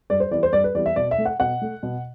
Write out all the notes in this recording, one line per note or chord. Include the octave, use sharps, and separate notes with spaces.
G2 D5
C5
E3 G3 B3 D5
C5
G2 D5
B4
E3 G3 B3 D5
E5
B2 D5
E5
A3
F#5
B2 F#5
A3
B2